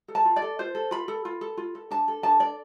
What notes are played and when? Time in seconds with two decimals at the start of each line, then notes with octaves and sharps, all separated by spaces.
0.08 A4
0.15 A5
0.25 F4
0.36 D5
0.42 A4
0.59 F4 C5
0.75 A4
0.91 F4 B5
1.08 A4
1.25 F4
1.41 A4
1.57 F4
1.75 A4
1.91 D4 A5
2.08 A4
2.23 D4 A5
2.40 A4 D5